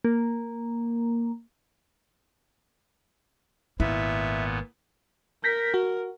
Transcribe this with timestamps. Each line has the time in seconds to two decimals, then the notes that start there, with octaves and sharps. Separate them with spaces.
0.05 A#3
3.80 G#1 A#2 B3 E4 E5
5.44 A#4 G6 A#6 B6
5.74 F#4